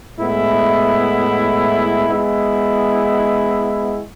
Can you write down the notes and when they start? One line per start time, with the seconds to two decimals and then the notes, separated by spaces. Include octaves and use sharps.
0.18 A2 G#3 B3 E4
2.09 G#3 B3 E4